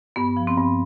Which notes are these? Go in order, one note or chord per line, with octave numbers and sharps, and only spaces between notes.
G2 B3
F3
C4
G2